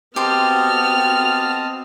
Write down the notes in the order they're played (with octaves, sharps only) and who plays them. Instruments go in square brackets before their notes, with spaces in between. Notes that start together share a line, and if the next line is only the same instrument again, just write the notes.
[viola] B3 F#4 [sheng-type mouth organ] C4 D#5 A5 [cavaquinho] G4 C6 [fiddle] F6